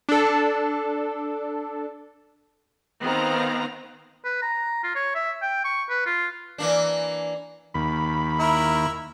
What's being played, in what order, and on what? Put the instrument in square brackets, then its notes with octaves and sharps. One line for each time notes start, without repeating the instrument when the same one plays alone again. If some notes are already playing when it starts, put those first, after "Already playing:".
[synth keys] D4 A4
[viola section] D#3 B3 C4 F5 A#5
[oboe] B4
A#5
F4
C#5
E5
G5
C#6
B4
F4
[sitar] E3 A#3 D4
[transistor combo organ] D#2 B5
[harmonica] E4 A#4